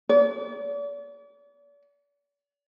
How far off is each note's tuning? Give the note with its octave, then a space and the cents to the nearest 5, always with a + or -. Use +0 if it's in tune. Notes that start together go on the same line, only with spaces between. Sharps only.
D5 -40